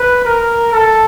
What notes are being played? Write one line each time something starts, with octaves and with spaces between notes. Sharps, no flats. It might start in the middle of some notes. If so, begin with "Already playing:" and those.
Already playing: B4
A#4
A4